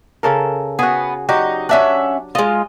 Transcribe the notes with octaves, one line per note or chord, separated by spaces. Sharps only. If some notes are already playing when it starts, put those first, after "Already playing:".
C#3 A4 A#4
B3 F#4 G#4
F#3 D#4 F#4 G4
C#4 D4 E5 F#5
G#3 F4 D#5